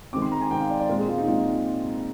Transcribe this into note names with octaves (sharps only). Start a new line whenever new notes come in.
D#3 G#3 C4 D6
C6
A#5
G#5
D#3 G#3 C4 G5
F5
D5
D5
A#2 G#3 C4 A#4
G#4
F4
D#4
A#2 G#3 C4 F4